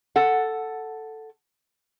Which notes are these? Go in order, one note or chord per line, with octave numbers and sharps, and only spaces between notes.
A4 F#5